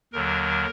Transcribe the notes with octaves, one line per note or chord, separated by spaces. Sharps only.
D#2 D3 F#3 A#4